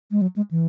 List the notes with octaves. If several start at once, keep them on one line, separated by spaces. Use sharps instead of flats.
G#3
F#3
G#3
E3